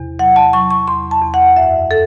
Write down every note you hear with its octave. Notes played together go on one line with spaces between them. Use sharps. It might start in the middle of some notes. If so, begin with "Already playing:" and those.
Already playing: E2 C3
F#3 F#5
A5
F#3 C#6
C#6
E2 C6
A5
E2
F#5
F#2 E5
A4